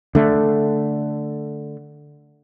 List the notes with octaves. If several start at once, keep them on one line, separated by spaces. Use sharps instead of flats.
D3 A3